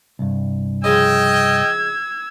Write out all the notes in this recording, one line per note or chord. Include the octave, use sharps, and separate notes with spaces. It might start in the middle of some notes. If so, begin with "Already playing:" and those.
C2 G2
C#3 F3 G#3 D#5 G5 E6 G#6